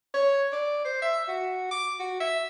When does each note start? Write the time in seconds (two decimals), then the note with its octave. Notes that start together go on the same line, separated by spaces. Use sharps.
0.14 C#5
0.52 D5
0.85 C5
1.02 E5
1.28 F#4
1.71 D6
2.00 F#4
2.20 E5